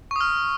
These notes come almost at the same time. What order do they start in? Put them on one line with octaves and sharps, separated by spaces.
C#6 D#6 F6